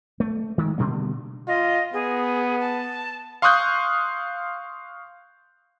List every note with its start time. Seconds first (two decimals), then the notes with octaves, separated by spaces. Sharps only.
0.20 A3
0.58 D#3 G#3
0.78 B2 D3 G3 A#3
1.48 F4 D#5
1.93 B3 G#4
2.60 A5
3.42 F5 C6 C#6 D#6 F#6 G6